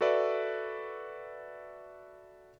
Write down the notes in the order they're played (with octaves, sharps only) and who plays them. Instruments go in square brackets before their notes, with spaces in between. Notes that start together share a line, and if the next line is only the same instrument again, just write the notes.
[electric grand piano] F#4 A4 B4 D5 E5